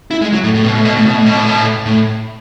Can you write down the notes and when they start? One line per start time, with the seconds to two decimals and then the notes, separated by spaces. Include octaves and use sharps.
0.11 E4
0.22 G#3
0.33 F#3
0.44 A2
0.54 A2
0.64 B2
0.75 A2
0.85 B2
0.95 A2
1.06 B2
1.16 A2
1.26 B2
1.37 A2
1.47 B2
1.57 A2
1.86 A2